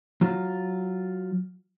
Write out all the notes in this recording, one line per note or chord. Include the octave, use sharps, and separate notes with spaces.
F#3 F4